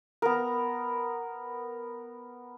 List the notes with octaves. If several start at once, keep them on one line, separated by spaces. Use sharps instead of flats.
B3 A#4